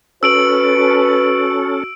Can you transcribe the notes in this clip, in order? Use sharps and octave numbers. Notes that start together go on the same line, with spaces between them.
C#4 F#4 A4 B4 E6 D7 F#7
F#4